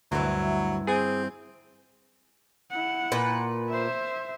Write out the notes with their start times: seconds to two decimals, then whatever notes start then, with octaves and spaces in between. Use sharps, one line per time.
0.12 D2 G2 E3 F#3
0.87 C4 G#4 G#5
2.70 E4 F#5
3.12 A#2 B4
3.70 C5 E5